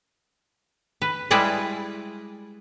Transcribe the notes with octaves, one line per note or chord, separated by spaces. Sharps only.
B4
G3 G#3 E4 G#4 B4 D5